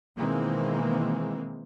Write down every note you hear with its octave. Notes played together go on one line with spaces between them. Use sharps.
B2 D#3 E3 G#3 A#3 C4